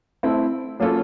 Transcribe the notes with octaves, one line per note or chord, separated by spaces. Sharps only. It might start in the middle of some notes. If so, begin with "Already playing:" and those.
A3 C4 E4
F#3 A#3 C#4 F4 A4